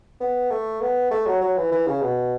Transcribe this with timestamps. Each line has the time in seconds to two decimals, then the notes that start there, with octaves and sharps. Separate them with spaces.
0.21 B3
0.51 A3
0.81 B3
1.11 A3
1.26 F#3
1.41 F#3
1.57 E3
1.72 E3
1.87 C#3
2.02 B2